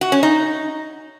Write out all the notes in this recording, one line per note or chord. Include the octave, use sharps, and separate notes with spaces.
F#4
C#4
D#4